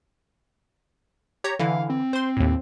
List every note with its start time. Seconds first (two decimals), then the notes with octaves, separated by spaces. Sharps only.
1.44 G4 C#5 A#5
1.59 D3 E3 E4 F5
1.90 C4
2.13 C5 C6
2.37 D#2 A2